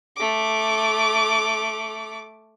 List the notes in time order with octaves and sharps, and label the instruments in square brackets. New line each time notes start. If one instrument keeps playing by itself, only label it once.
[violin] A3 D6